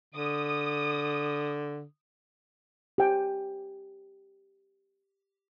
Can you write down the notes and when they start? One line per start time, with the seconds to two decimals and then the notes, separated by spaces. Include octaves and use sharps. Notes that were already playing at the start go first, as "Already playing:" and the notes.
0.14 D3 D#6
2.98 G4 G5 G#5